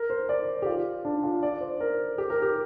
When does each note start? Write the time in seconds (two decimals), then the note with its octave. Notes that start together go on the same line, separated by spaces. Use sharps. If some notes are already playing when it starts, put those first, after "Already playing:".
Already playing: A#4
0.10 C5
0.29 D5
0.62 G4
0.66 F4
1.05 D4
1.23 F4
1.43 D5
1.61 C5
1.80 A#4
2.18 G4
2.30 A#4
2.42 G4